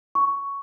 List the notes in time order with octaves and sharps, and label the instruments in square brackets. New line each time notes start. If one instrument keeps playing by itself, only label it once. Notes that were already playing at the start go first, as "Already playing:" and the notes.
[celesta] C#6